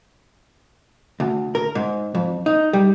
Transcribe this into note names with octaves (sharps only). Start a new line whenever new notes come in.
D2
A#4
G#2
F2
D#4
G3